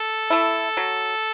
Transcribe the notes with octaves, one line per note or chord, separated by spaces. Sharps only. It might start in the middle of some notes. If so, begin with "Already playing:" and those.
Already playing: A4
A3 E4
F#3